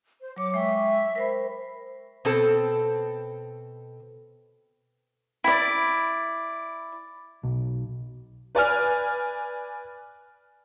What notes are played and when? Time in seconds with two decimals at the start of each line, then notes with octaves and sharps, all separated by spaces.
0.21 C5
0.36 F#3 C#5 D6
0.54 G#3 E5 G5 C#6
1.16 A#4 C5 B5
2.25 B2 C4 A4
5.44 E4 D5
7.43 B1
8.55 B4 D5 G#5 F6